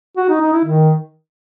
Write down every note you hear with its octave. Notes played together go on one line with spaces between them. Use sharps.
F#4
D#4
D#4
E4
D#3